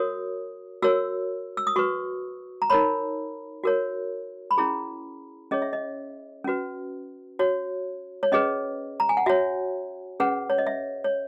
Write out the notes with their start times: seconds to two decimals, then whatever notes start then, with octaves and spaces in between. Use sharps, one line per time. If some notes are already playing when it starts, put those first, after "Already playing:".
Already playing: F#4 A#4 C#5 D#6
0.82 F#4 A#4 C#5 E6
1.57 E6
1.67 D#6
1.76 F#4 B4 C#6
2.62 A#5
2.70 D#4 A#4 C#5 B5
3.64 F#4 A#4 C#5
4.51 B5
4.58 C#4 E4 G#4 A#5
5.51 C#4 G#4 C#5 D#5
5.62 E5
5.73 D#5
6.45 C#4 F#4 B4
7.39 F#4 C#5
8.23 C#5
8.32 C#4 G#4 B4 D#5
9.00 A#5
9.09 G#5
9.17 F#5
9.26 F#4 C#5 E5
10.20 C#4 G#4 B4 F#5
10.50 C#5
10.58 D#5
10.67 E5
11.04 C#5